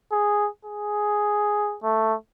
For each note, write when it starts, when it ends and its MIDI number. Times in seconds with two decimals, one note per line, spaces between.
0.12 0.48 68
0.65 1.77 68
1.83 2.14 57